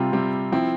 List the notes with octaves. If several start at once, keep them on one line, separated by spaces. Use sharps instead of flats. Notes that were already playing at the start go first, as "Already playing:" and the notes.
Already playing: C3 G3 C4 F4
C3 G3 C4
F3 C4 E4